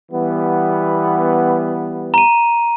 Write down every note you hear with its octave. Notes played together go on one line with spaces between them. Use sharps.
E3 G3 B3
A#5 D#7